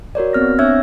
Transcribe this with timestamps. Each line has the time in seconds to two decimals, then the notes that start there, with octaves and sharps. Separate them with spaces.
0.15 F#4 A#4 C#5 D5
0.33 B3 C4 F6 A#6
0.59 C4 D4 C#5 E5 E6 G#6